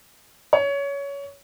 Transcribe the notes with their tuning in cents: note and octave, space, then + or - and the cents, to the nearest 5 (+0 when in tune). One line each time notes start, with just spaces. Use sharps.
C#5 +20